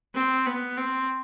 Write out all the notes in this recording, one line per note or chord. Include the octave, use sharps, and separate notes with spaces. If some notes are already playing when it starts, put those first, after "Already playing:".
C4
B3
C4